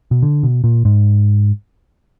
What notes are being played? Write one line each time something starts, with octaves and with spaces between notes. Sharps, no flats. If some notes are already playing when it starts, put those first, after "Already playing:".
B2
D3
B2
A#2
G#2